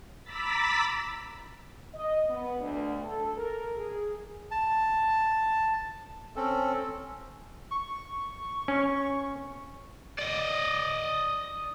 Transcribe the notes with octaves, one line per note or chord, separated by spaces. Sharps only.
A#5 B5 D6 E6 A6 B6
D#5
B3
D2
A4
A#4
G#4
A5
C4 C#4 A4
C#6
C#4
D5 D#5